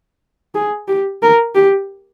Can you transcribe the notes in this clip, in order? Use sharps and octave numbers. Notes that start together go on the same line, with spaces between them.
G#4
G4
A#4
G4